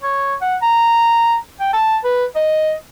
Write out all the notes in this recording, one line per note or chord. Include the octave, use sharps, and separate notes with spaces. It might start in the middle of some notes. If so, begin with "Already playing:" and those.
C#5
F#5
A#5
G5
A5
B4
D#5